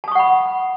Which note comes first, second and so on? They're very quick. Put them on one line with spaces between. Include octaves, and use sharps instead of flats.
A5 D#6 C#6 F#5 B5